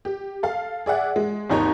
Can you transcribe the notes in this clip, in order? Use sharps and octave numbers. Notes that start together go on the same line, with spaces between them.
G4
A4 F5
G#4 D5 E5 F#5
G#3
G#1 D#2 D#4 C#5 A#5